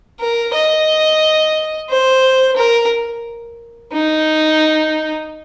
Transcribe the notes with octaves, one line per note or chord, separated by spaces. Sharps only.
A#4
D#5
C5
A#4
D#4